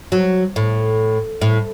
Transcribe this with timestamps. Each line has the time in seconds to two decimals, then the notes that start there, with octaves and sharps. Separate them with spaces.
0.12 F#3
0.56 A2
1.41 A2